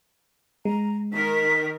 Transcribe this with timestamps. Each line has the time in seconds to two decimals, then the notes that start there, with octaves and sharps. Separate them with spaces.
0.65 G#3 A#5
1.13 D#3 A#4 B6